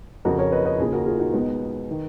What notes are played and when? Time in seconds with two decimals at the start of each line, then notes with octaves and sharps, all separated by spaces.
0.25 F2 C#3 F#4 A#4
0.39 A#4 C#5
0.52 B4 D#5
0.65 B4 D#5
0.79 D#2 C#3 F4 G#4
0.93 F#4 A#4
1.06 F4 G#4
1.19 D#4 F#4
1.33 C#2 B2 B3 D#4
1.91 D#3